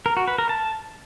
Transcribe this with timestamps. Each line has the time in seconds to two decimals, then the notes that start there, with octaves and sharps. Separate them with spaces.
0.06 A#4
0.17 F#4
0.28 B4
0.38 A#4
0.49 A5